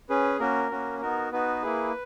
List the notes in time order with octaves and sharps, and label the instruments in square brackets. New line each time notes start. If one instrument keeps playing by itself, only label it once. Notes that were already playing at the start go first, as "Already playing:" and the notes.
[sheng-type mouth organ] C#4 G#4 B4
A#3 C#4 F#4 A#4
A#3 C#4 F#4
B3 D#4 F#4 A#4
B3 D#4 F#4 B4
A#3 E4 G#4